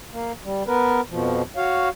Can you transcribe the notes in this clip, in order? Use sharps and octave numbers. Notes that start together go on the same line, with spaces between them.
A#3
G3
B3 A#4 B4
F2 B2 F3
F#4 C#5 F5